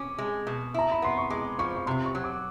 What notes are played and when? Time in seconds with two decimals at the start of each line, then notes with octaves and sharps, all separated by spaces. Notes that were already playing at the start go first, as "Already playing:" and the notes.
Already playing: C#4 D6
0.18 G#3
0.47 B2
0.74 E4 A#5
0.92 B5
1.02 B3 C6
1.18 C#6
1.30 G#3 D6
1.59 F3 C#6
1.76 C#6
1.86 C3 C6
2.05 C#6
2.15 F#3
2.24 D6